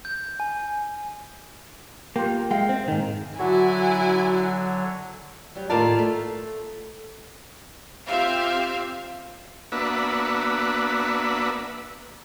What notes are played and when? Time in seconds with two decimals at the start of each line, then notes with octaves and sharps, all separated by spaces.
0.05 G6
0.40 G#5
2.16 A#3 F4 G4
2.51 G#3 E5 F5 G5
2.69 C4
2.88 G#2 D#3
3.39 D3 F#3 E4 F#4 C#5 G#5
5.55 F#3 G3
5.70 D#2 A2 F4 A#4 D5 A5
5.99 A3
8.06 C4 F4 G4 E5 F5
9.72 A#3 B3 D4 F#4 B4 E5